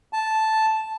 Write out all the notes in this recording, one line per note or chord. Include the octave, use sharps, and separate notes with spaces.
A5